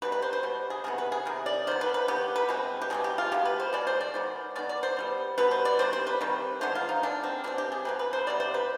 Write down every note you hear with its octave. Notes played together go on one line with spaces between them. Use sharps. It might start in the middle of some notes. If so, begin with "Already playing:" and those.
B2 G3 C4 B4
B4
C5
C5
B2 G3
G#4
C3 D#3 B3 G#4
B4
G#4
C3 D#3
D5
D#3 B3 C5
B4
B4
D#3 B3 G4
B4
B2 G#3 C4
G4
B2 G#3 C4 G#4
G4
F4
B2 G#3 B3 G4
B4
C5
B2 G#3 D5
C5
D5
D#3 G#3 B3
D#3 G#3 B3 D5
D5
C5
B2 G3 B3
B2 G3 B3 B4
C5
D5
D#3 G3 C4 C5
C5
B4
D#3 G3 C4
D3 G#3 B3 C5
F4
D#4
D3 G#3 B3 D4
C4
B2 G#3 C4 D4
G4
G#4
B2 G#3 C4 B4
B4
C5
C3 G3 B3 D5
C5
B4